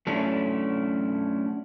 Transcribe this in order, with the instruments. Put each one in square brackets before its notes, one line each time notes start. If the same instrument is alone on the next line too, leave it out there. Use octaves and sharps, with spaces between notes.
[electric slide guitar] F#3 A3 C#4 D4 E4